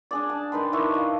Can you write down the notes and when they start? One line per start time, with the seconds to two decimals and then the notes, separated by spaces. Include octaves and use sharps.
0.11 D4 G#4 D5
0.30 A5
0.52 D#3 D#4 B4 C6
0.73 D#3 D4 E4 C#6
0.94 D#5 F5